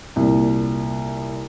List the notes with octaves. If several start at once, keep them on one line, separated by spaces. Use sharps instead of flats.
C2 A#2